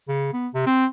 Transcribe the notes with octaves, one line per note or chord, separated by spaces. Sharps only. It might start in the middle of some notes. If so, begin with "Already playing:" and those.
C#3
B3
C3
C4